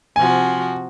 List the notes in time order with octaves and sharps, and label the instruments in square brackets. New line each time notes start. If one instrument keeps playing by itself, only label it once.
[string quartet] C3 F3 F#4 [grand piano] G#5